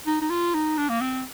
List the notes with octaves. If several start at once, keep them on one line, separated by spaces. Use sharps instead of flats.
D#4
D#4
F4
D#4
D4
A#3
C4